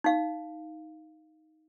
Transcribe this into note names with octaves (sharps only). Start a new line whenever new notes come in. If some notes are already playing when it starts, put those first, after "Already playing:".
D#4 F5